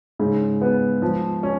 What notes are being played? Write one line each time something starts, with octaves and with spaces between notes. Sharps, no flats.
G#2 C#3
B3
F3
C#4